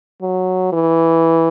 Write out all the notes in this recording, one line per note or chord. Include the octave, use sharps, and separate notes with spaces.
F#3
E3